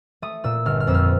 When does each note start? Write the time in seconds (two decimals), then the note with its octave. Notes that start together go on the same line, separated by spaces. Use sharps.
0.22 A3 D#6
0.44 A#2 E6
0.65 G1 F6
0.80 F6
0.87 F2 E6
0.94 F6